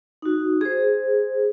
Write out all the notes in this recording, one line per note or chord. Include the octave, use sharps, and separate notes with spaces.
D#4 F#4
G#4 C5